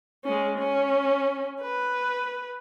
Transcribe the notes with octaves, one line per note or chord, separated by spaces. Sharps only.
G#3 C#4
C#4
B4